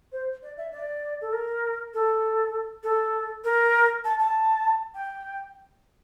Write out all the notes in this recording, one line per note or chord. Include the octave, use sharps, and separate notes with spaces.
C5
D5
E5
D5
A4
A#4
A4
A4
A#4
A5
A5
G5